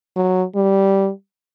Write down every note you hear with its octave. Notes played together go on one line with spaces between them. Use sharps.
F#3
G3